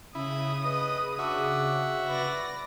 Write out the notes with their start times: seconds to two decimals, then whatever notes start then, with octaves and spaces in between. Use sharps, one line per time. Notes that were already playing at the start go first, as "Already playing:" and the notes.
0.15 C#3 E4 D#6
0.65 B4 D#5
1.19 D4 F#4 E5
2.08 B4 D5 A#6